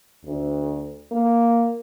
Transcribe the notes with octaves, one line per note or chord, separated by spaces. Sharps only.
D2
A#3